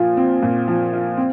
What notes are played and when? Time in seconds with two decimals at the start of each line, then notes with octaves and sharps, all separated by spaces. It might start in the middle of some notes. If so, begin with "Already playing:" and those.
Already playing: A#2 F3 F4
0.17 C4
0.42 A#2
0.68 F3
0.93 F4
1.17 C4